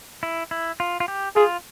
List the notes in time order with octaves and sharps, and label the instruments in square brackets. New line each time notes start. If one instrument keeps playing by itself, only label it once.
[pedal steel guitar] E4
E4
F4
F4
G4
[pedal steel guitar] F4 [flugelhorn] G#4